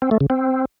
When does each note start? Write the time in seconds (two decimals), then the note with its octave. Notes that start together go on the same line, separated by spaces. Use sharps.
0.02 C4
0.11 A3
0.21 C#3
0.30 C4